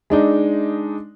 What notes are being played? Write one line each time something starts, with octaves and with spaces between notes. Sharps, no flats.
G#3 D4 D#4